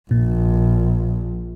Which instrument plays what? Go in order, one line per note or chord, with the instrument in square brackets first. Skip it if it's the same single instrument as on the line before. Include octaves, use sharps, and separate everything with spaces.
[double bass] A#1 [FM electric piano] A#2